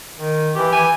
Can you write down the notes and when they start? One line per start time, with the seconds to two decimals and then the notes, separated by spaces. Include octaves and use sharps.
0.18 D#3
0.55 E3 G4
0.73 E3 G#5